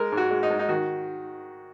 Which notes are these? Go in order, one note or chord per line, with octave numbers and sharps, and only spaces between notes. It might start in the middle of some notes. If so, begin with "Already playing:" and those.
Already playing: G#3 A#4
G#2
F#4
G#3
D#4
G#2
D#4
D#3 F#4